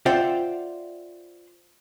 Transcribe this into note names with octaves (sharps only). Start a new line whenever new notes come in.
F4 C5 D5 E5 F#5 G5